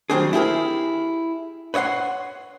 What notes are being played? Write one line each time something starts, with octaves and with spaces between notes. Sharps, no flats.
D#3 F#3 G3 C4 D4 G#4
E4 G4 G#4 A#4
B4 C#5 D#5 F#5 C6